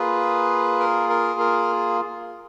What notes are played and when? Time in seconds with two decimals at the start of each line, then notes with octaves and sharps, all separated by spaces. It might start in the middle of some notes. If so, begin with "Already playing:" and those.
Already playing: A#3 F4 G#4 B4
0.79 A#4
1.10 A#4
1.40 A#4